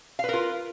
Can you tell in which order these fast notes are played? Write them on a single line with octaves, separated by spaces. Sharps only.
F5 B4 A#4 F4